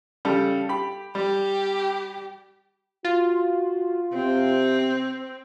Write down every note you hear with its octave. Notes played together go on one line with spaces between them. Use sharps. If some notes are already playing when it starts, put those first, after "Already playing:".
C#3 G3 A4
G4 B5
G3 G4
F4 F#4
C3 C4